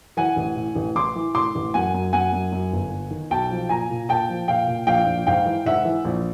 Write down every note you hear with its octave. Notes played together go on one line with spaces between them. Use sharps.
E3 F#5 G#5
A1
A2
A1
A1 C6 D6
E3
A2 C6 D6
A1
F#2 F#5 G#5
F#2
F#2 F#5 G#5
F#2
F#2
G1
G1
D#3
B1 G5 A5
F3
A#2 G#5 A#5
A#2
A#2 G5 A5
F3
A#2 F5 G5
A#2
A#1 F5 G5
A#1
G#2 F5 G5
E3
G#2 E5 F#5
E3
A#1